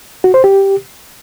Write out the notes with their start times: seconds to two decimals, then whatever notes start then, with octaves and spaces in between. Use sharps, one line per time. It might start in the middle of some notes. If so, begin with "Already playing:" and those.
0.24 F#4
0.34 C5
0.44 G4